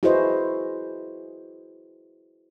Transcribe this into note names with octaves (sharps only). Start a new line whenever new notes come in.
E4 F#4 G#4 B4 C5 D#5